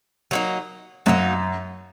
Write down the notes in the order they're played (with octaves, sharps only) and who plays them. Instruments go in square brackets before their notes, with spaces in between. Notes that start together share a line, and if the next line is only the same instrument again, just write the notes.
[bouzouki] F#3 A#3 D#4
[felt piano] F#2 [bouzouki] F#3 A#3 D#4